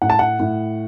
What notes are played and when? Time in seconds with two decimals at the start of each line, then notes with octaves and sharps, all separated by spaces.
0.02 A2 F#5
0.10 A5
0.19 F#5
0.40 A2